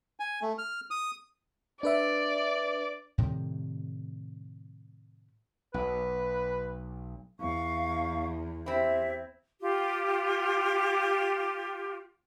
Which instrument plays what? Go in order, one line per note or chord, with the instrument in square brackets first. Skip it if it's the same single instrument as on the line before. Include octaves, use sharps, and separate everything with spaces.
[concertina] G#5
A3
F6
D#6
[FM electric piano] D4 B4 E5 [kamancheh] D5
[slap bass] A2 C3 D#3 G3
[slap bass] B1 [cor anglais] B4
[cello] E2 [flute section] F5 C#6
[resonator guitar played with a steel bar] C4 E4 [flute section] G4 C5 E5
[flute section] F4 G4